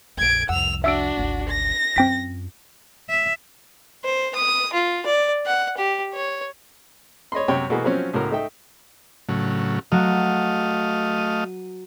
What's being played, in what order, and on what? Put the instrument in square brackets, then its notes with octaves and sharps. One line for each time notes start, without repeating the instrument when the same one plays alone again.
[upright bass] A#1 F2 [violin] G#6 D7
[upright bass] C2 F2 [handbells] F#5 [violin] E6 F7
[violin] D4 F#4 [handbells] E5 E6 D7
[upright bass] G#1 D2
[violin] A#6
[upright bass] F#2 F4 [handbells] C4 G5 B6
[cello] E5
[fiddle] C5
D#6
F4
D5
F#5
G4
C#5
[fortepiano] C#5 D#5 B5 C6
F#2 C3 C#5 G5
B2 E3 A3 A#3 F#4 G#4
F3 F#3 C4 C#4
C#2 A2 F#4 A#4
A3 D#4 E5 G5
[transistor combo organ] A2 C#3 F#3
[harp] F#3 F#4 [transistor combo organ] A3 D#5 F5
[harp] D#7